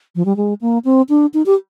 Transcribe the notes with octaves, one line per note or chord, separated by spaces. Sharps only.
F3
G3
G#3
A#3
C4
D4
D#4
G4